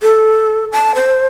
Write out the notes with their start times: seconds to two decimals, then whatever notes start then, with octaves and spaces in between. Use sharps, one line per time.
0.02 A4
0.72 A5
0.95 C5